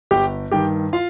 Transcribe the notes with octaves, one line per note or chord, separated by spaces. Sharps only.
G1 G4 G5
G2 D#3 G4 G5
F4 F5